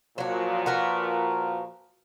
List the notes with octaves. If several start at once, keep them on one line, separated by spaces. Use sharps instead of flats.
A#2 F3 F#3 F#4
F#4 A#4 B4